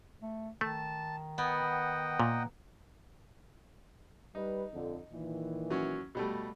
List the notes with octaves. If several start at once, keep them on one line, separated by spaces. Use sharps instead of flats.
A3
D#3 A3 A5
B3 D#5 F#5 G5
A#2 A#3
G3 D#4 B4
F2 D3
A#2 D#3 E3
F#3 C#4
B2 G3 A3